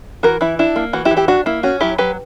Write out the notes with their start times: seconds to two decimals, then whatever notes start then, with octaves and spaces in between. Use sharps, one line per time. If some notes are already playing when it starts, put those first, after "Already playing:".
0.23 E3 F#4 A#4
0.41 E3 E4
0.59 D4 E4
0.76 A#3
0.93 E3 F#4
1.05 E4 G4
1.11 E3
1.17 E4 G4
1.28 D4 F#4
1.46 A#3 E4
1.63 C#4 F#4
1.81 F#3 E4 G4
1.98 F#3 G4 B4